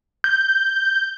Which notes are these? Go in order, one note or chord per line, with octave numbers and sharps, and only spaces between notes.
G6